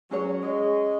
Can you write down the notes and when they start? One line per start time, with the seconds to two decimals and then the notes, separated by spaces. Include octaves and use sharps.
0.11 F#3 C#4 G#4 C#5
0.43 G#3